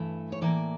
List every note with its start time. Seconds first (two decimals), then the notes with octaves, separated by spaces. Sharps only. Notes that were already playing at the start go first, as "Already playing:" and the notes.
Already playing: G2 E3 A3
0.32 C#5
0.41 A2 E3 A#3 D5